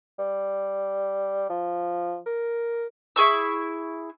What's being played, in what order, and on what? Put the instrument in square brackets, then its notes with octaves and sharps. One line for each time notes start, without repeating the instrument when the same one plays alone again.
[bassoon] G3
F3
A#4
[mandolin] E4 G#4 C#6 E6